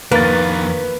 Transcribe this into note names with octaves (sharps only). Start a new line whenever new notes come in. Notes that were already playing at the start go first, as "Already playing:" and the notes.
F2 D#3 A#3 B4 A6